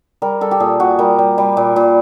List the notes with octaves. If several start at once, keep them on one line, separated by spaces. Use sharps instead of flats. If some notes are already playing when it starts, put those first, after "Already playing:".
G3 A#4
G3 A4
G4
A#2 G#4
A#2 F#4
G3 A#4
G3
G3
A#2
A#2